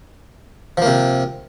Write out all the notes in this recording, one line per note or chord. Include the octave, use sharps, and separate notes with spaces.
C3 F3 A#3